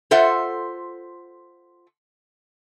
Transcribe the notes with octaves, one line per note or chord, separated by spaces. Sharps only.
F4 A4 C5 E5 F#5